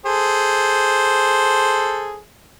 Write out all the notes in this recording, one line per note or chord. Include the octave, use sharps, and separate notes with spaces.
G#4 A4 C5